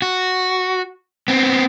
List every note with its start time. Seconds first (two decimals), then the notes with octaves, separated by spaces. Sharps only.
0.02 F#4
1.28 B3 C4